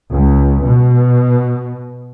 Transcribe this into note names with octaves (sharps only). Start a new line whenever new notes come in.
C#2
B2